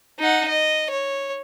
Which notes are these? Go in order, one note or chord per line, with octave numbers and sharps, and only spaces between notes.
D#4 F#5
D#5
C#5